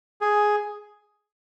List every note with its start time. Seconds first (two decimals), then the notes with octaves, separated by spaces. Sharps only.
0.21 G#4